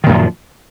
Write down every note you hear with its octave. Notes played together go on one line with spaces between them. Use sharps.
F#2 A#2 D#3 F3